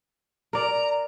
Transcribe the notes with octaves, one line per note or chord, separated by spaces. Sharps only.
A#4 D5 A#5